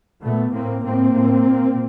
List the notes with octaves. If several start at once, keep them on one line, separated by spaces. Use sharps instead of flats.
A#2 A3 B3
A2 A#3 C4
A2 A#3 C4
A2
A#2